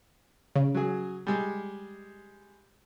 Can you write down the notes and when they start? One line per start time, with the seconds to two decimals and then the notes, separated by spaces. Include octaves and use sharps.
0.55 C#3
0.75 F#3 G#4
1.27 G3 G#3